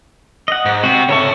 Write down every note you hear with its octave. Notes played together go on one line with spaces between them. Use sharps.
D#5 F#5
G#2
C3 F#4
C#3 A4 C#5 E5 C#6